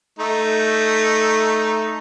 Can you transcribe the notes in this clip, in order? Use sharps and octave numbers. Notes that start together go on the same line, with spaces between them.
A3 D#4